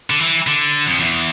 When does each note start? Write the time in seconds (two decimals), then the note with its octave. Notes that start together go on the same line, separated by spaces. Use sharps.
0.10 D3
0.20 E3
0.47 D3
0.88 F2
1.00 E2